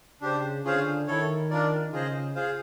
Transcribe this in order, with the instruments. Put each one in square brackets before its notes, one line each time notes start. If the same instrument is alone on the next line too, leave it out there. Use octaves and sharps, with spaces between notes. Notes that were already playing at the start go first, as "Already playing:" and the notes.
[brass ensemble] C#3 [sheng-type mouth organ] D4 G4 C5
[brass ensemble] D3 [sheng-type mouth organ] C#4 F4 G#4 C5 F5
[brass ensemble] D#3 [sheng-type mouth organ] E4 A4 C#5
[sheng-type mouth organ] D4 F4 A#4 D5
[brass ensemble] C#3 [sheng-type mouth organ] F4 G#4 C5 D#5
[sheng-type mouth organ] F4 G#4 C5 F5